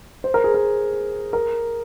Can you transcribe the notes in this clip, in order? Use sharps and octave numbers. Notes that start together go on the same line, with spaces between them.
C5
A#4
G#4
A#4
A#4